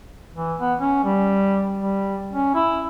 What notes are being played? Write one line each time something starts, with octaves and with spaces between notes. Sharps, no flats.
E3
B3
C#4
G3
G3
C#4
E4